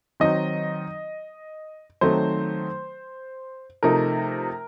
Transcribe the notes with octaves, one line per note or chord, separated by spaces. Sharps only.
D#3 F#3 C4 D#4 D#5
D#3 F#3 A3 C4 D#4 C5
C3 F3 A3 D#4 A#4